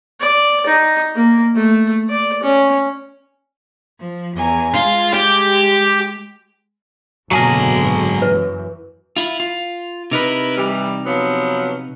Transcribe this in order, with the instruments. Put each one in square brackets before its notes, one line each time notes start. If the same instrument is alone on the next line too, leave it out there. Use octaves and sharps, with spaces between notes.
[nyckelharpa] D5
D#4
A#3
A3
D5
C#4
[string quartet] F3
E2 G#5 A#5
[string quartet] G#3 [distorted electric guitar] F4
[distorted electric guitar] G4
[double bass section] F#1 B2 D3 [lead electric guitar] G#2 A5 [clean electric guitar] F#3 G#4 A#4
[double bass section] F#2 E3 [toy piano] B4
[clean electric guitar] E4 F4
F4
[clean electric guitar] C3 D#4 [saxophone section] E4 A#4 B4
[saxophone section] E3 G3
F3 F#3 B3